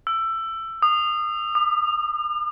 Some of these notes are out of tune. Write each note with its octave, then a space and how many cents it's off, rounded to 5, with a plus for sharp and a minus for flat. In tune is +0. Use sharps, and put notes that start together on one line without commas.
E6 +15
D#6 -25
D6 +45